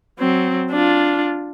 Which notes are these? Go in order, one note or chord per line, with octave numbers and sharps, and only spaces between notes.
F#3 C4
D4 F4